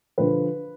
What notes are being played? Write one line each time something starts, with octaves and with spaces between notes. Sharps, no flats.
D3 F3 B4